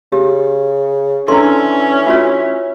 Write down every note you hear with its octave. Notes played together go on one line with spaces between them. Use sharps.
C#3 G4
E3 C#4 D4 E4 A4 C6
F4 F#4 C#5 E5